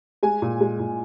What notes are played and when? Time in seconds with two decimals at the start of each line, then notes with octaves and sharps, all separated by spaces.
0.23 G#3 G#5
0.42 A#2
0.61 G#3
0.79 A#2